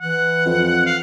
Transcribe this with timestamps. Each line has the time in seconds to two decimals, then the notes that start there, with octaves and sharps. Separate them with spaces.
0.01 E3 F#5
0.46 F2
0.86 F5